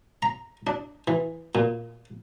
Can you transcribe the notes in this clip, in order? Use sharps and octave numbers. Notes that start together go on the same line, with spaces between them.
A#5
D4
E3
A#2